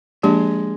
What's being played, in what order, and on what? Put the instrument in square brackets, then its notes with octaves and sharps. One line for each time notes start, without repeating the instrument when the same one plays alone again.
[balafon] F3 A#3 D4 G4 [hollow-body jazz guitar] G#3